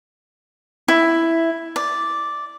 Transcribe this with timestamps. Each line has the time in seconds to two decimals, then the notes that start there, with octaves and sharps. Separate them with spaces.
0.88 E4
1.76 D5